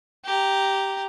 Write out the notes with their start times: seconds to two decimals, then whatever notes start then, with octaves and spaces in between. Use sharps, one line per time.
0.25 G4 A#5